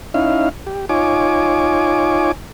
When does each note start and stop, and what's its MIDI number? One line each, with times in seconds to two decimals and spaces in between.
0.14 0.49 61
0.14 0.49 63
0.14 0.49 64
0.14 0.49 77
0.67 0.86 67
0.89 2.32 63
0.89 2.32 65
0.89 2.32 73
0.89 2.32 80
0.89 2.32 86